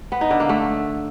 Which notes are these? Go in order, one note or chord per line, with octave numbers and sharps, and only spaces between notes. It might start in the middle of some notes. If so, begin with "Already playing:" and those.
B3
D#4
D3
A#3
A3